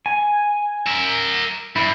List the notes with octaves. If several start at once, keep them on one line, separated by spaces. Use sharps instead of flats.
G#5
A#4 E5
G2 E4